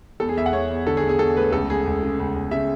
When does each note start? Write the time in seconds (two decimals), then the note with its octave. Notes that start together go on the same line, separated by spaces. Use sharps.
0.20 E2 A4
0.29 G#4
0.37 E2 E5
0.46 F#5
0.53 E2 C#5
0.70 E2
0.87 D3 A4
0.97 G#4
1.03 E2
1.09 G#4
1.19 E2 A4
1.37 A3 B4
1.52 C#2 A4
1.69 C#2 G#4
1.86 C#2
2.03 C#3
2.19 C#2
2.35 C#2
2.51 C#3 E5